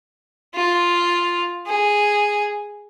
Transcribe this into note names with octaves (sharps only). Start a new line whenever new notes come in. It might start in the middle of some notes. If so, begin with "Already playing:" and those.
F4
G#4